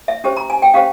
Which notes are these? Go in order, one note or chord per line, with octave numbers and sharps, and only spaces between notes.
E5
C#4 G4 C5
A#5
G#5
G5
C#4 G4 C5 F5